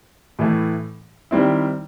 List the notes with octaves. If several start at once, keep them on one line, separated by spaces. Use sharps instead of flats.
A2 E3 A3
D#3 G3 C4 E4